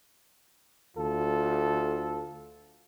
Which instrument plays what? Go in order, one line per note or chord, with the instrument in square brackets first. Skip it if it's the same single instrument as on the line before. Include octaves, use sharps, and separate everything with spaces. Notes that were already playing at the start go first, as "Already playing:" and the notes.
[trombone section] D2 F4 A4